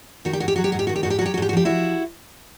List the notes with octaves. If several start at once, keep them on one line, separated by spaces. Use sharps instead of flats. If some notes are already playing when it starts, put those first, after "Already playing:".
D#3 F#4
G4
G#2 F#4
G4
F#3 F#4
G4
G#2 F#4
G4
D#3 F#4
G4
G#2 F#4
G4
F#4
F#3 G4
F#4
G#2 G4
F#4
F3 G4
F3 E4 F#4